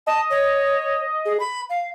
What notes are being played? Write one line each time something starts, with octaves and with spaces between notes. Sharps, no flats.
D#5 A5
C#5
G#4
B5
F5